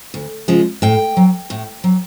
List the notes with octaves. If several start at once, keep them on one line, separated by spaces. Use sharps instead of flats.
D2
C#3 F3 G#3
A2 G5
F#3
A2
F#3